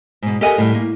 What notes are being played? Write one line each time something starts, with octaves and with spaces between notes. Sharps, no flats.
G#2 B2
G4 A4 A#4 D#5 F#5 G#5
A2 G3
A#3